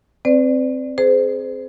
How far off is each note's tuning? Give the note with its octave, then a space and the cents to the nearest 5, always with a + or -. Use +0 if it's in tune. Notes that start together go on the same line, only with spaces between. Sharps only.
C4 +0 B4 +45 D5 +0
G#4 +15 C5 -30